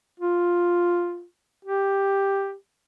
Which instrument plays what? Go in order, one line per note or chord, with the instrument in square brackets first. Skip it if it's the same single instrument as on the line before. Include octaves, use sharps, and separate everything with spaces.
[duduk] F4
G4